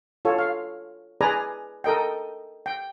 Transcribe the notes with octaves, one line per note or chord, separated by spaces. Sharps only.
F4 A4 C#5
F5
G#4 B4 D5 G#5 A#5
A4 A#4 D#5 G5
G5